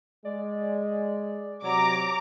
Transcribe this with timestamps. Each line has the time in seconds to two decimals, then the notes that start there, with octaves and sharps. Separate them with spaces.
0.25 G#3 D5
1.63 C3 F#3 A#5 D6